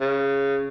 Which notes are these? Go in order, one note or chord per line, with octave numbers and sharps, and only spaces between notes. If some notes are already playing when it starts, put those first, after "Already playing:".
C#3